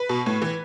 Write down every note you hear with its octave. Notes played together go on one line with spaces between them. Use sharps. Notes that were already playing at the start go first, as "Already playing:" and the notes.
Already playing: B4
B2
A2
E3